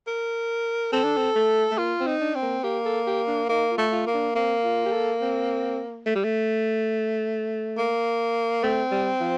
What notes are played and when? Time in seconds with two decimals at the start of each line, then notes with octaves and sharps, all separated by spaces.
0.07 A#4
0.93 C4 A4
1.04 D4
1.17 C4
1.36 A3
1.71 A3
1.78 A#3 F4
2.00 C4
2.07 D#4
2.21 D4
2.35 C4
2.42 A#3
2.64 A#3 G4
2.86 A4
3.07 G4
3.28 D4
3.49 A#3 D#4
3.71 F4
3.78 A3
3.92 F4
4.07 A#3
4.14 D4
4.35 A#3 C4
4.64 F4
4.86 G4
4.92 A4
5.21 C4
6.06 A3
6.15 G3
6.24 A3
7.78 A#3
8.63 A3 C4
8.92 G3
9.21 F3